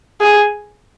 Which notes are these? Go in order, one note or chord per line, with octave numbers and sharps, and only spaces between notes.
G#4